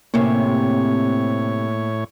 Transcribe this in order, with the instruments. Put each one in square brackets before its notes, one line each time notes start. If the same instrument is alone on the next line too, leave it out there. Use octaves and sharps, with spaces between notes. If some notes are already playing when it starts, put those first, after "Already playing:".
[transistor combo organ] A2 C#5 [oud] C3 C#4 [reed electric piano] A#3